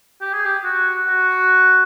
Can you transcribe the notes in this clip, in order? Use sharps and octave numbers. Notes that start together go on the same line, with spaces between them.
G4
G#4
G4
F#4
F#4